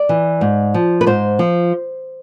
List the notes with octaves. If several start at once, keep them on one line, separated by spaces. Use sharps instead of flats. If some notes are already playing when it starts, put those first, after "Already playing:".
Already playing: D5
E3
G#2
F3
B4
G#2 C5
F3